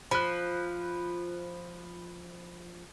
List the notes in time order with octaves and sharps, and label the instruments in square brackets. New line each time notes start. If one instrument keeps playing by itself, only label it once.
[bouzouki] F3 [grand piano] B5 F#6